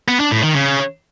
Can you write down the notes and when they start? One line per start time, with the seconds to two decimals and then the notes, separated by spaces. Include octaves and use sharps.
0.08 B3
0.20 D4
0.31 A2
0.43 D#3
0.55 C#3